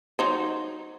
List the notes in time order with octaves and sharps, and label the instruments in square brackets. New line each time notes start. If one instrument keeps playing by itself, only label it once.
[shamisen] F#3 D#4 C5